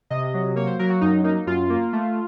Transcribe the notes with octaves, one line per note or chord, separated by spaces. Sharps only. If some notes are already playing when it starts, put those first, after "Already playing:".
C3 D#5
F#3
A#3 C#5
C5
F#3 A#4
F#4
F#2 D#4
A#3 D#4
F#2 F4
A#3
A3